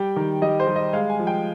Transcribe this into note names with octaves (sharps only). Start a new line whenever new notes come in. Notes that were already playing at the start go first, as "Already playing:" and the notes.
Already playing: G3 G5
D#3
G3 D#5
C5
G3
D#5
G#3 F5
G#5
F3
G5